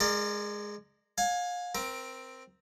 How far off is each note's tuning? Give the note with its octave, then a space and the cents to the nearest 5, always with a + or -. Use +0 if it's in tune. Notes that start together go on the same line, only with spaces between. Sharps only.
G#3 +0 A#4 -15 D5 +35
F5 +30 G#5 +0
C4 +0 A#4 +25